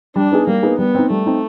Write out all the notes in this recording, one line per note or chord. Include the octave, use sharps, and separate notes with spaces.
G3 D4
B3 D#4 G#4
G3 A#3
B3 D#4 G#4
G3 B3
C4 D#4
G3 A3
C4 D#4